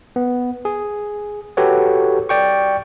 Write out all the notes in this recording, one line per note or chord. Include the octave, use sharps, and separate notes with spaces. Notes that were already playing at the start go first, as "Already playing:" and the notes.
B3
G#4
F#4 G4 A4 B4 C#5
D5 G5 C#6